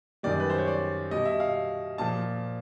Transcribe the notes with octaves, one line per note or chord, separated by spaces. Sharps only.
F#2 D#3 G3 D5
B4
C5
C#5
D5
B2 G3 D#5
E5
F5
A#2 F3 A5